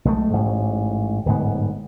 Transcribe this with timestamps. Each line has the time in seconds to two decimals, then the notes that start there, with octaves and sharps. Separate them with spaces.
0.05 B1 G#3 A3
0.33 A1 G#2
1.26 D1 G1 G#2 B3